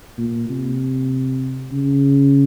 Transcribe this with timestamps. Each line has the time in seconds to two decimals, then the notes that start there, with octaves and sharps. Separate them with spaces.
0.18 A#2
0.50 C3
1.72 C#3